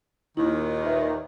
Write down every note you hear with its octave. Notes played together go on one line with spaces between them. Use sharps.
D#2 A#2 D#3 E4
B4 E5